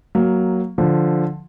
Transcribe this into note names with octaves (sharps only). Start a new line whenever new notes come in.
F#3 A#3
D3 F3